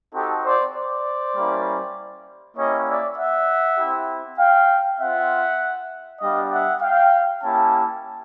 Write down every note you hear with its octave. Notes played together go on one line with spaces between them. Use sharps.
C4 D#4 F#4 G4 A4
C5 D5
C5 D5
G3 A#3 C#4 E4
A#3 C#4 E4 G4 C#5 D#5
D5 E5
E5 F#5
C4 E4 G4
F5 G5
C4 F4 E5 F#5
G3 B3 D4 G4 D#5 F5
E5 F#5
F5 G5
A#3 C#4 E4 G4 G5 A5